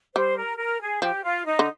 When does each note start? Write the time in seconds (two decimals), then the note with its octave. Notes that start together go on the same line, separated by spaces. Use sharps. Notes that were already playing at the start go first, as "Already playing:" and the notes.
0.15 G3 C5
0.37 A#4
0.58 A#4
0.81 G#4
1.02 F3 G4
1.23 F4
1.45 D#4
1.59 D3